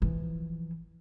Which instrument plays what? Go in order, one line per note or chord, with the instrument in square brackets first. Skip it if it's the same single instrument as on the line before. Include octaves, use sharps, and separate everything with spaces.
[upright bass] E3 F3